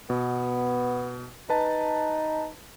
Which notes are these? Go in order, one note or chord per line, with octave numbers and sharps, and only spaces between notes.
B2 B3
D#4 B4 A5